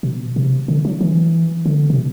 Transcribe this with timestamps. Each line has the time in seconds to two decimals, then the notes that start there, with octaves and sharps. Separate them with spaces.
0.03 B2
0.36 C3
0.68 D3
0.85 F#3
1.01 E3
1.66 D3
1.90 C3
1.98 B2